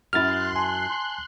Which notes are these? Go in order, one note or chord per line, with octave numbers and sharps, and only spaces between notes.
F#2 E4 C6 F6 F#6 A6
G#5 A5